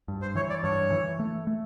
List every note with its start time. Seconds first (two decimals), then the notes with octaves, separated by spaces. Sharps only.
0.08 G2
0.22 C5
0.36 E3 C#5
0.50 D5
0.64 G2 C#5
0.92 E3
1.20 A3
1.47 A3